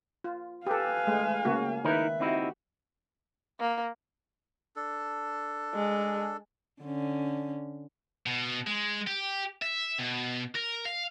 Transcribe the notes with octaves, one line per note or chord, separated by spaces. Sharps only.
F4
G4 A4 B4 F5 G#5
G#3 A3
C#3 A#3 F#4
D#3 D#4 E4 A#4 B4 E5
C4 D#4 E4 F#4 G4
A#3
D4 A4
G#3
D3 C#4
B2
G#3
G4
E5
B2
A#4
F5